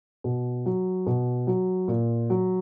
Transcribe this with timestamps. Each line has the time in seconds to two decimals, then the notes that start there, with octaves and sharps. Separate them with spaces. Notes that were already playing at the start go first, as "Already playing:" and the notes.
0.24 B2
0.66 F#3
1.07 B2
1.47 F#3
1.88 A#2
2.30 F#3